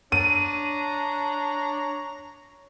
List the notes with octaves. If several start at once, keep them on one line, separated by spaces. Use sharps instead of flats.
D4 C#5 A#5 D#7